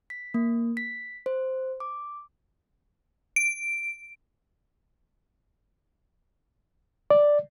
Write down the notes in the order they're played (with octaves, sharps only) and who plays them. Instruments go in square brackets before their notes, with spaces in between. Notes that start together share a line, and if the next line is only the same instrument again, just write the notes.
[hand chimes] B6
A#3
B6
C5
D6
[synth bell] D7
[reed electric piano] D5